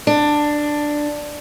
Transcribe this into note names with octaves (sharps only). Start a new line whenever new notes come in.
D4